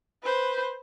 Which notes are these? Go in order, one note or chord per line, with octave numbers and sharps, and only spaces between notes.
B4 C5